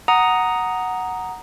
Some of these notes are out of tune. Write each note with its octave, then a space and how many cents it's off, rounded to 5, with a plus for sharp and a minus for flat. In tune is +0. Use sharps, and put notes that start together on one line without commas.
F#5 +0 A#5 +0 D#6 +0